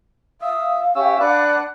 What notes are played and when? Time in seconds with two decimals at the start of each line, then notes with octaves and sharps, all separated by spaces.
0.41 E5 F5 D#6
0.95 C#4 G4 E5 F#5 E6
1.20 D4 B4 D5 F#5 F#6